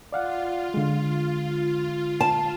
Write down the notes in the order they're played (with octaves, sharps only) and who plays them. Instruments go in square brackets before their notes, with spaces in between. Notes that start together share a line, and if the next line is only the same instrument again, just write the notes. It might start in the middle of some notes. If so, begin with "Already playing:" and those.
[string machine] F4 [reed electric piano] D5 F5 F#5
[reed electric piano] D3 G#3
[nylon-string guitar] A5